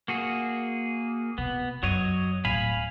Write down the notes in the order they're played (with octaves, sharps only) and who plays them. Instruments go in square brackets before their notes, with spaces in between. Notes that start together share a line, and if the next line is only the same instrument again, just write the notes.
[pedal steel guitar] A#3 F#4 G#4
[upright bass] C3 [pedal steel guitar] B3
[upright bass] F#2 [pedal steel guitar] F#3 C#5 D#5
[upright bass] D1 [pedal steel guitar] F5 G#5 B5